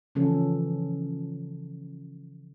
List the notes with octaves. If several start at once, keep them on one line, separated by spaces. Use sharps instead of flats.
C#3 E3 F3 C#4 A4